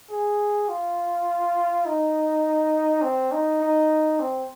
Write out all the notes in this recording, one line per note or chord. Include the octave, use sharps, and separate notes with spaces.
G#4
F4
D#4
C4
D#4
D#4
C4